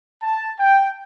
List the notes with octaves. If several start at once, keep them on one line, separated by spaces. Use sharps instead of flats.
A5
G5